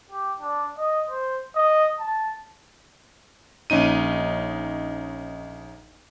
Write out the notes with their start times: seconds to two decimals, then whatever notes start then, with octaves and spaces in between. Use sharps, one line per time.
0.11 G4
0.40 D4
0.78 D#5
1.10 C5
1.56 D#5
1.99 A5
3.70 A#1 C#4 D#4 D#7